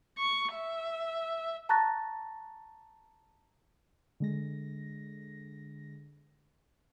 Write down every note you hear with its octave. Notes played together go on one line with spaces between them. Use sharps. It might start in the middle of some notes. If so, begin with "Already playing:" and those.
C#6
E5
A5 A#5 C#6 F#6 A6 A#6
D3 G#3 A#6